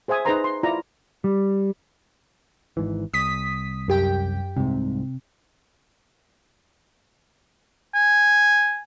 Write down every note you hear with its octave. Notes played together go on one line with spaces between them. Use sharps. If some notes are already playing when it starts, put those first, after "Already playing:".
G#4 C5 E5 G#5 D#6
D#4 G#4 B4 C5 A#5 C6
C6
E4 F4 D5 A#5
G3
G#1 G#2 E3
C2 D#6 B6
F#2 G4 G5
C2 G#2 C3
G#5